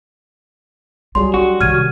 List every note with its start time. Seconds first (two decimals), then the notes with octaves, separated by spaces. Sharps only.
1.15 F#3 G3 F4 G#4 C6
1.34 D4 F#4
1.61 C3 D#3 F6 G#6 D#7